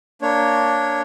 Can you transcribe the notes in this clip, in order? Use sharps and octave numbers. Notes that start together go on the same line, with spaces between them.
A#3 D4 C#5